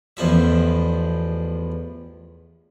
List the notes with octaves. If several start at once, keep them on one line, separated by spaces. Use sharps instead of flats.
A1 E2 F3 E5